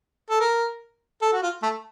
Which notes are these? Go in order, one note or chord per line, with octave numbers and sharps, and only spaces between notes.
A4
A#4
A4
F#4
F4
A3